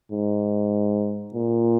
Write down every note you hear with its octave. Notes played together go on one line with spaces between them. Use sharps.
G#2
A#2